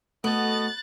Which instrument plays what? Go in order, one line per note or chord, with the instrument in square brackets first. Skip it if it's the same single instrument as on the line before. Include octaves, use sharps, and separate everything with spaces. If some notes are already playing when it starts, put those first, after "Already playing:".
[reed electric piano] A3 [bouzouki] B3 [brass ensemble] F#4 A4 D#5 [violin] F#6 A6